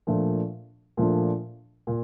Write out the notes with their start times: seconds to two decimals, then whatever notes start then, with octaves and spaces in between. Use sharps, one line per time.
0.07 A#2 F3 A3 D4
0.97 A#2 F3 A3 D4
1.87 A#2